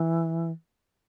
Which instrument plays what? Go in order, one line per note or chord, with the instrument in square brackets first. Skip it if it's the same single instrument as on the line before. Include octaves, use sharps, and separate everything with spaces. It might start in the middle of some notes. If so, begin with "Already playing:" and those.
Already playing: [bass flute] E3